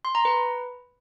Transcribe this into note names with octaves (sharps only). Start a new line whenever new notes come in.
C6
A#5
B4